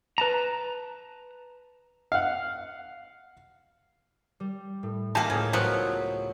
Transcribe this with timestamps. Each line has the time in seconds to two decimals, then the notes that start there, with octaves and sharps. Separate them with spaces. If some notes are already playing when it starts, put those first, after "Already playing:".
0.18 B4 A5 A#5
2.12 F5 F#5
4.40 G3
4.83 A2
5.15 A#3 D#4 F4 G4 G#5 A5
5.30 C#2 A2 C#3 E7
5.53 F3 F#3 B3